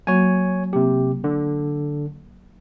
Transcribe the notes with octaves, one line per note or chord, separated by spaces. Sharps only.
F#3 A#3 F#4 C#5 G#5
C3 A#3 G4
D3